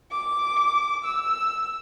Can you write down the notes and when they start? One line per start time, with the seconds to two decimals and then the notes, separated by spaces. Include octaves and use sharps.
0.11 D6
1.04 E6